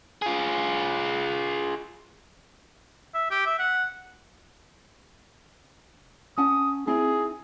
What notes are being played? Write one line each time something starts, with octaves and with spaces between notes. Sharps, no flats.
F4 G#4
E5
G4
E5
F#5
C#4 F#5 A5 D#6
C4 D#4 E4 G#4